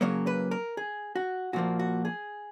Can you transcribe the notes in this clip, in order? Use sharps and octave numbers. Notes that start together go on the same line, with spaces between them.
C#3 F#3 A#3 C#5
B4
A#4
G#4
F#4
A#2 F3 A#3 F#4
F#4
G#4